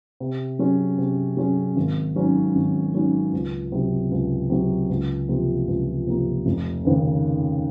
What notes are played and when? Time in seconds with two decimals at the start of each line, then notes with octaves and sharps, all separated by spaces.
0.20 C3
0.59 F#3 C#4 G#4
0.98 C3
1.37 F#3 C#4 G#4
1.76 G#1
2.16 G#2 F#3 C#4
2.55 G#1
2.94 G#2 F#3 C#4
3.33 C#2
3.72 C3 F#3
4.11 C#2
4.50 C3 F#3
4.89 C#2
5.29 C3 F3 A#3
5.68 C#2
6.07 C3 F3 A#3
6.46 F1
6.85 D#2 C#3